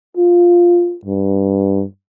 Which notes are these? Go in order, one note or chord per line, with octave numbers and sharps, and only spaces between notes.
F4
G2